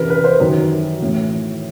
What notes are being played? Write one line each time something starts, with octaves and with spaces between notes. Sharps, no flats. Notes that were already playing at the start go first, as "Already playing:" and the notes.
Already playing: E2 C3 E3 A#4 B4
B4
C5
F#2 D#3
A2 E3